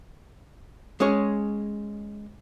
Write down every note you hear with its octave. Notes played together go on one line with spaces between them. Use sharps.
G#3 C#4 G#4 C#5